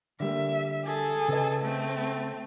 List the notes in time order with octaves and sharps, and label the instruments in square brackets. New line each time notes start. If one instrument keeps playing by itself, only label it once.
[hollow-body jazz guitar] D3 G3 A#3 [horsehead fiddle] E5
[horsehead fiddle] G#4 A4
[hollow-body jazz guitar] C#3 B4 D#5
[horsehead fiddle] A3 C4